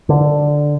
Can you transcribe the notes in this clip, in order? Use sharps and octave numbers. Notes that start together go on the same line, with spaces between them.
D3